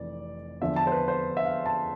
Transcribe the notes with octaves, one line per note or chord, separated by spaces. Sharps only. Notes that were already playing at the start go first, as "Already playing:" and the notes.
Already playing: F1 F2 E3 D5
E2 D3 F3 E5
A5
C5
B4
C5
E5
F5
A5